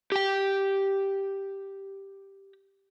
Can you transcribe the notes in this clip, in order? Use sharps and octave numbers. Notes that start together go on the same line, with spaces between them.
G4 G5